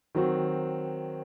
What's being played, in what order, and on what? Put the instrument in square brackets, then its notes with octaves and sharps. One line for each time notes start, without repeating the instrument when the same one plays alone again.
[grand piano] D#3 F#3 C4 F#4